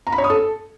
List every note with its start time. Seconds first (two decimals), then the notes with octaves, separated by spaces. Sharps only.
0.07 A#5
0.12 B5
0.18 C#5
0.24 D#6
0.30 A4